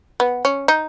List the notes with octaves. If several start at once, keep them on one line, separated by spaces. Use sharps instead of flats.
B3
C#4
D#4